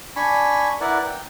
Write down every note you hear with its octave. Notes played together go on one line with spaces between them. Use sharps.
D4 G#5 B5 C#6
E4 A#4 B4 D5 F#5
G5